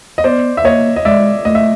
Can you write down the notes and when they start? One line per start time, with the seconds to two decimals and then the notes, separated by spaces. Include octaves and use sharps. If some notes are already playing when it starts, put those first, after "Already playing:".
0.18 D#5
0.24 B3 C5 D5
0.57 E5
0.65 A#3 C#5 D#5
0.96 D#5
1.05 G#3 D5 E5
1.45 A3 D#5
1.55 E5